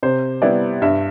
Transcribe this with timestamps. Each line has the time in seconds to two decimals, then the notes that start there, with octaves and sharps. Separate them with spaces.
0.03 C3 C5
0.42 G3 B3 E4 D5
0.82 G2 E5